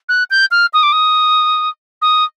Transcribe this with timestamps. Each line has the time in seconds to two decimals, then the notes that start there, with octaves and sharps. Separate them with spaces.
0.09 F#6
0.31 G6
0.51 F6
0.73 D#6
0.83 D6
0.92 D#6
2.02 D#6